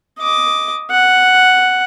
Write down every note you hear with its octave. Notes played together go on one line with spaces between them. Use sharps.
D#5 D6
F#5